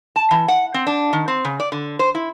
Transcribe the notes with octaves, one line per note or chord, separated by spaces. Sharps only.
A5
E3
F#5
C4
D4
D#3
C4
C#3
D5
D3
C5
E4